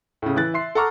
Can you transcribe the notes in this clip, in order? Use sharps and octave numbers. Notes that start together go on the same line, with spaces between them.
A2 C#3
E3 F#6 A6
E5 C6 C7
A4 F#5 A#5 C#6 D6 F6